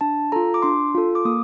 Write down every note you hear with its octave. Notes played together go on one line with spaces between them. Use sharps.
D4 A5
F4 A4 A#5
D6
D4 C6
F4 A4
D6
A#3 D#6